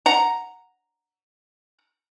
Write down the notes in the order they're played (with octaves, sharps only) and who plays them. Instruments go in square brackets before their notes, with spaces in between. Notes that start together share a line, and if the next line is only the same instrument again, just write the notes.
[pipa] F#5 A#5